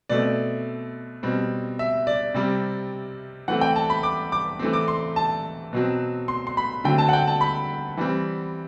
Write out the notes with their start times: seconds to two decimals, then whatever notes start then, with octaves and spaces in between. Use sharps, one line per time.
0.09 B2 A3 C4 D5
1.23 B2 G3 C4
1.79 E5
2.07 D5
2.34 C3 G3 C4
3.48 E3 A3 C4 F#5
3.61 G5
3.76 A5
3.90 B5
4.03 D6
4.32 D6
4.59 E3 A3 C4
4.73 D6
4.88 C6
5.16 A5
5.73 B2 F#3 C4
6.28 C6
6.47 C6
6.57 B5
6.84 D3 F#3 A3 C4 G5
6.98 A5
7.09 F#5
7.13 G5
7.27 A5
7.41 B5
7.97 E3 G3 C4